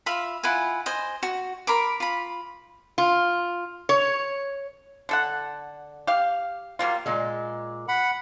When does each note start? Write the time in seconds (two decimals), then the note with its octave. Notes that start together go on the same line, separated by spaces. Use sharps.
0.06 F4 E5 B5
0.43 E4 F4 F#5 G#5
0.86 C5 D#5 G#5
1.23 F#4
1.67 A#4 B5 C6 D6
2.00 F4 B5
2.98 F4
3.89 C#5
5.09 D3 A4 F#5
6.07 G4 F5
6.79 F#3 G3 A#3 F4
7.06 A#2 G#3
7.88 F#5 B5